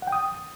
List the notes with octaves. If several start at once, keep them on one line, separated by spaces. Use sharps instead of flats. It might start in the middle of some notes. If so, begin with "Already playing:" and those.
F#5
G5
D#6